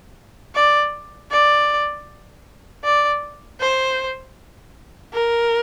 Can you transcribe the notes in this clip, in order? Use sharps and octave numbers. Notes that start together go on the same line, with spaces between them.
D5
D5
D5
C5
A#4